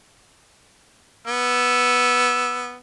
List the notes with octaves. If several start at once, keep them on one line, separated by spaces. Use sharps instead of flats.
B3 E6